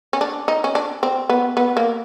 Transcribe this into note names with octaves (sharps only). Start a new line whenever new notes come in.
C#4
D4
D#4
C#4
D4
C4
B3
B3
A#3